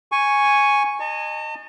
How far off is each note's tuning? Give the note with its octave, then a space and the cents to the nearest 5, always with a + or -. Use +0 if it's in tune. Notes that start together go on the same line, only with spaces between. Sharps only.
G#5 +0 C#6 +0
D#5 -25 A5 +40